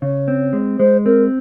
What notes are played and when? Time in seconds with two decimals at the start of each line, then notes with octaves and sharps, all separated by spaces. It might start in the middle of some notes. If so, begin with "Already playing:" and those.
0.02 C#3 C#5
0.28 C4
0.53 G#3
0.79 G#3 C5
1.05 C4 A#4